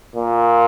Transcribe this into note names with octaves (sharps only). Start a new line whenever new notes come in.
A#2